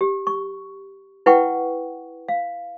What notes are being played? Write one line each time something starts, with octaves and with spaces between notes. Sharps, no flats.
G4
C#6
E4 B4 F#5 G5 C#6
F5